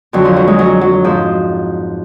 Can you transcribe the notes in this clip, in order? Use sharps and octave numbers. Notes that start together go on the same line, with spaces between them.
F2 D3 F#3
F3
F#3
G#3
F#3
F#3
G#2 F3